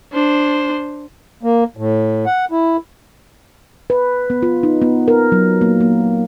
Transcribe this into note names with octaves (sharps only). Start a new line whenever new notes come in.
D4 C5
A#3
A2
F#5
E4
B4
B3
F4
D#4
B3
A#4
F#3
A#3
A#3